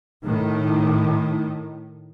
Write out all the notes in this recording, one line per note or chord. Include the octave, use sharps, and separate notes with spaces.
A2 D#3